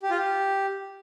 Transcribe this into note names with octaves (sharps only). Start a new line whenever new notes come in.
G4
F4
G4